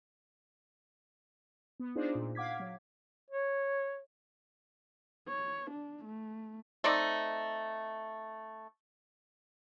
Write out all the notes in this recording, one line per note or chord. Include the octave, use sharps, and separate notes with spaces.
B3
D4 D#4 F4 G#4 C5 D5
A#2
F5 F#5 D6 G#6 B6
F#3
C#5
C#5
D4
A3
A3 C4 D#4 D5